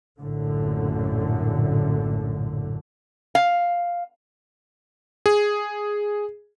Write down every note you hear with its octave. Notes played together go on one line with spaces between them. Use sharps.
A#1 F#2 A2 D3
F5
G#4